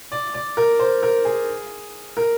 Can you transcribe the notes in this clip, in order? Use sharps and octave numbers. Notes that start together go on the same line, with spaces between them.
D5
D5
A#4
C5
A#4
G#4
A#4